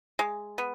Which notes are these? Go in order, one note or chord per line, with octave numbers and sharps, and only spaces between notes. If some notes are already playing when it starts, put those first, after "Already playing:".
G#3
B3